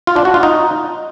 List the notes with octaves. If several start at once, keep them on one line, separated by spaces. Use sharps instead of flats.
F4
D4
F#4
F4
D#4